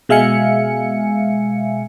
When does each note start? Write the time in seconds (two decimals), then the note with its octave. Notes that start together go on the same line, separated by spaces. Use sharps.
0.09 B2 G#3 E5 F5 G#5 C#7